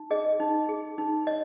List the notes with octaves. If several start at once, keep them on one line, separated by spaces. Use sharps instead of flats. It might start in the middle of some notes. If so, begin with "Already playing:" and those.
Already playing: D#4
G#4 D#5
D#4
G#4
D#4
C#5 D#5